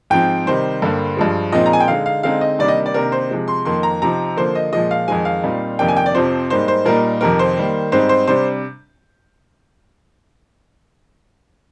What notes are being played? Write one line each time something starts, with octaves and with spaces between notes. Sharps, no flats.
G#2 F3 C4 G5
C3 D#3 G3 C5
G2 D3 G3 A#3
G2 F3 G#3
A#2 F3 G#3 C4 D#4 D#5
A#5
G#5
G5
D3 G#3 D#4 F5
F5
D3 G#3 C4 D#4 F5
D#5
C3 D#3 G3 A#3 D4 D5
D#5
D5
C3 D#3 A#3 D4 A#4
C5
C3 F3 G#3
C6
F2 D#3 A#3 C6
A#5
C3 F3 C4 D#4 A#5
D3 F3 A#3 C5
D#5
A#2 F3 G#3 D#5
F5
F2 D#3 G#3 G#5
F5
A#2 G3 C4 D#4
F2 C3 D#3 A#3 D4 G5
G#5
G5
D5
F2 C3 F3 C4 C5
G#2 G3 A#3 D#4 C5
C5
A#2 G3 A#3 D#4 A#4
F2 C3 D#3 A#4
C5
D#3 G3 A#3
G#2 G3 C4 D#4 C5
C5
C3 G3 D4 C5